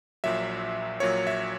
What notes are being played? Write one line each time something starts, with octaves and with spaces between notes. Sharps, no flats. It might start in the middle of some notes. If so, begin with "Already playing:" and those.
A#1 A#2 F#3 E5
A#1 A#2 F#3 C#5
E5